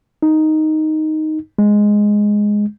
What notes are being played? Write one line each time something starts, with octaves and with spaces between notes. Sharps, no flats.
D#4
G#3